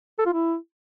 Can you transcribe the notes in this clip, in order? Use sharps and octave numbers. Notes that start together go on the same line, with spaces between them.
A4
F4
E4